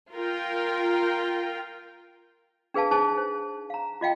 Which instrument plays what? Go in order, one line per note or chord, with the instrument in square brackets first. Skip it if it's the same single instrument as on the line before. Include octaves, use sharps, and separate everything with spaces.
[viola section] F4 A#4 G5
[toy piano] D4 G#4 B4 F5 A5
D#4 G#4 C5 A5
C5
F5 A#5
F4 D#5 F5 G5